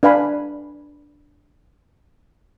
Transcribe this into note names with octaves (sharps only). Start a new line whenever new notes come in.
D4 B4 F5 G#5 B5